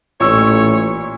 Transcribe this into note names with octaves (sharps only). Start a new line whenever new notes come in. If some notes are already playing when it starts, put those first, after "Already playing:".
A1 A#2 C#5 C#6 E6